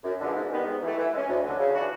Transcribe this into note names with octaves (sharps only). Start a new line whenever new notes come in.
F#2
D3 F3 G#3 B3
G#2
D#3 G3 B3 D#4
G#2
E3 A3
E3
G#3 C#4
D2
D3 F#3
C#3
E3 A3 D4 F#4